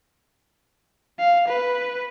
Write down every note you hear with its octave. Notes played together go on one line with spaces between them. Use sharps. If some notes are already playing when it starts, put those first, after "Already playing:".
F5
B4